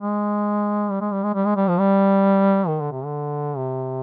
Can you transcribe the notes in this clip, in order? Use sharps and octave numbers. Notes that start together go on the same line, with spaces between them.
G#3
G3
G#3
G3
G#3
G3
G#3
G3
F3
G3
D#3
D3
C3
D3
C3